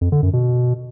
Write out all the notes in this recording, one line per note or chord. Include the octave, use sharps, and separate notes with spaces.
F2
D3
F#2
B2